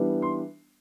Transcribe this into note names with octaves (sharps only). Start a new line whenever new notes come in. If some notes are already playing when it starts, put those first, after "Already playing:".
Already playing: E3 G3 B3 D4
C6